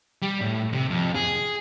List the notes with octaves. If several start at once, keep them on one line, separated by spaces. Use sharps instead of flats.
G3
A2
C3
F2
G#4